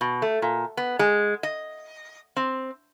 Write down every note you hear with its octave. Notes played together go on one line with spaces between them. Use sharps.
B2
A3
A#2
B3
G#3
D#5
C4